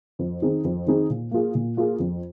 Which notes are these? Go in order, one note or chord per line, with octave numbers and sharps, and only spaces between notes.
F2
D#3 C4 D#4 G#4
F2
D#3 C4 D#4 G#4
A#2
A#3 F4 G#4
A#2
A#3 F4 G#4
F2